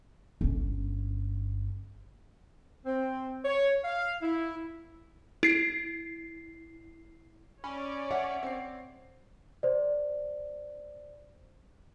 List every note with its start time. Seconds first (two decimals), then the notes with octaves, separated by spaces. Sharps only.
0.41 G1 C#4
2.85 C4
3.45 C#5
3.84 F5
4.22 E4
5.43 E4 C7
7.64 C#4 C#5 D5 B5
8.11 E5 F#5
8.43 C4 C7
9.63 C5 D5